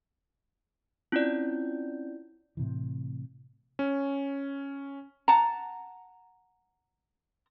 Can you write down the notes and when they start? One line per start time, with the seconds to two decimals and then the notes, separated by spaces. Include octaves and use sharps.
1.12 C4 C#4 E4 F4 D5 G6
2.57 A2 C3 E3
3.79 C#4
5.28 F#5 A5 A#5